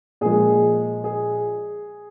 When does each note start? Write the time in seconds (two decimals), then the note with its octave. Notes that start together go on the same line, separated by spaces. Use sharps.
0.21 A#2 F3 G#3 G#4
1.04 G#4